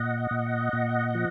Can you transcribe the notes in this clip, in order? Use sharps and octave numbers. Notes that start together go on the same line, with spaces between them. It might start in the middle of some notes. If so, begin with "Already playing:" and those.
Already playing: A#2 D#5 F#5
A#2
A#2
F3